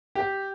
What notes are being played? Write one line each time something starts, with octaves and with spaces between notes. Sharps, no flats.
G4